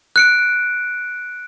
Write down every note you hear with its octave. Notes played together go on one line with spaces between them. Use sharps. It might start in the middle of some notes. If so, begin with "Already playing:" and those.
F#6 C#7 D7